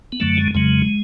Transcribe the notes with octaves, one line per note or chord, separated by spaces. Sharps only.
B3
F#2 D3 F#3 A3
G#3
F2 C#3 F#3 G#3